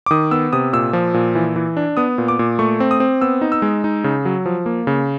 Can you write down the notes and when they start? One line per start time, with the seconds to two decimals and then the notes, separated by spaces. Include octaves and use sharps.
0.06 D6
0.11 D#3 D#6
0.31 B3 E6
0.53 C3 D#6
0.73 A#2 E6
0.93 F3
1.14 A#2
1.35 E3
1.56 E3
1.77 D4
1.97 B3 D#6
2.18 A#2
2.28 D6
2.39 A#2
2.59 A3 C#6
2.80 C4
2.91 D#6
3.00 C4
3.21 B3 E6
3.41 D#4
3.52 E6
3.62 G#3
3.84 D#4
4.04 C#3
4.25 F#3
4.46 F3
4.66 A#3
4.87 C#3